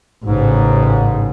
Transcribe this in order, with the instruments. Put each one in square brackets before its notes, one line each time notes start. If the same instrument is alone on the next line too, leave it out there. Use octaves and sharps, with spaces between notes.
[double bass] A1 C#3 [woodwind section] G#2